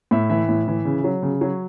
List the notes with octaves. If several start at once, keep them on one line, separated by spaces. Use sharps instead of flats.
A2 E5
E3 E5
A2
E3
C#3
F#3
C#3
F#3 C#5